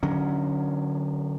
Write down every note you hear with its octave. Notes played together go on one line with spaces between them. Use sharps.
D3 F#3 C#4